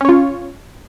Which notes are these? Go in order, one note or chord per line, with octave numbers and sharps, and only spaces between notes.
C#4 F4 C#5